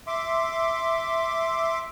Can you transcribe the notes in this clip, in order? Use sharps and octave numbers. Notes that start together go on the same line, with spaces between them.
E5 C6 D6